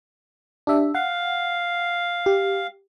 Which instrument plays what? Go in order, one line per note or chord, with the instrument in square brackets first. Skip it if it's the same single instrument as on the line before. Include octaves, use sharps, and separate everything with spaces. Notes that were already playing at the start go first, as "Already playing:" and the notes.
[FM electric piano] D4 G4 E5
[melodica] F5 [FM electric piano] F#5
[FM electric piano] G4